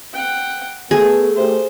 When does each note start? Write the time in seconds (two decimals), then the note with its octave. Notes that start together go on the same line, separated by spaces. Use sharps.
0.13 F#5 G5
0.91 A3 B3 G#4 A4
1.36 A3 G4 C5